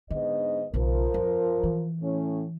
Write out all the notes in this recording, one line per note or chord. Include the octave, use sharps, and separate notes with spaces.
G#2 D3 B3 D#5
B1 C#3 F3 A#4
F2
E3
A2 C#4